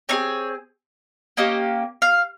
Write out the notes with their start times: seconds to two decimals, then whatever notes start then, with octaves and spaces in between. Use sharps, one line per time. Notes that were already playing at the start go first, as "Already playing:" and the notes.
0.09 C4 D#4 G#4 C#5
1.37 A#3 C#4 G4 D#5
2.02 F5